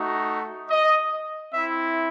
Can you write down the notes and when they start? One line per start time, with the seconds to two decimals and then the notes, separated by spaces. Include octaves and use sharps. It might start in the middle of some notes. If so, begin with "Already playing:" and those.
Already playing: A3 D#4 F#4
0.70 D#5
1.54 C4 E4 E5